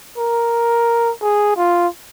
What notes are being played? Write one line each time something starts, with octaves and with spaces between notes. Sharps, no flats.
A#4
G#4
F4